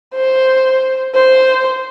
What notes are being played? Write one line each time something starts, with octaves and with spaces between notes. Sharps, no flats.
C5
C5